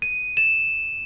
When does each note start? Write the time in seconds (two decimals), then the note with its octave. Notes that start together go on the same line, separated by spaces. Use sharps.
0.02 D#7
0.37 E7